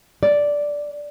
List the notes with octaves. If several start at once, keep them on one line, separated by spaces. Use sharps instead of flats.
D5